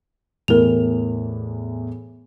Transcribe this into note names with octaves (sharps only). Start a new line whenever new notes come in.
E2 A2 E3 A#4 F7